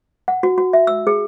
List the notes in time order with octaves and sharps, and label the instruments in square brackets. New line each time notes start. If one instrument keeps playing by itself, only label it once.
[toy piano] F#5
F#4
F#4
E5
E6
G#4